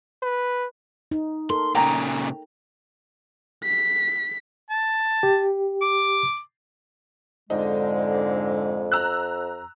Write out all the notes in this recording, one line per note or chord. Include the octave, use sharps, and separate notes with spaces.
B4
D#4
A4 A#4 C6
A#2 C#3 G5 A#5
B6
A5
G4
D6
F2 G#2 D3 G#3 D#4
A#5 E6 F#6